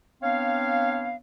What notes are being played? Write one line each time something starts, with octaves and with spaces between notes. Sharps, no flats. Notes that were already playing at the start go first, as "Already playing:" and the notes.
B3 C4 D4 C#5 F5